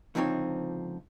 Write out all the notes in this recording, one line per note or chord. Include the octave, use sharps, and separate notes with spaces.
C#2 D3 F3 C4 D#4 C#5